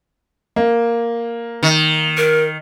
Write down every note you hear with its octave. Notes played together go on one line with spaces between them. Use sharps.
A#3
D#3
A#4